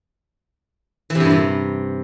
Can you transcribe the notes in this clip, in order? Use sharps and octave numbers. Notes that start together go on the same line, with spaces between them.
E3
C3
G2
A#2
C3